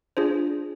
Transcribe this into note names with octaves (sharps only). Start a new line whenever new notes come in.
D4 F4 G#4 C5